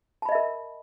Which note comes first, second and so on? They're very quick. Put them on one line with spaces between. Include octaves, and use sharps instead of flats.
A5 B5 D#5 E5 A#4